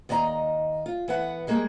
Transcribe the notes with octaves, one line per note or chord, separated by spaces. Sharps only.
D#2 D5 D#5 G#5 A#5
F4
E3 B3 F#5
G3 G#3 A#3 G#4